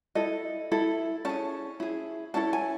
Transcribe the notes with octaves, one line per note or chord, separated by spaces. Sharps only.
E4 A4 D#5
E4 A4
C#4 G#4 A5
E4 G#4
C#4 E4 A4 A5
G#5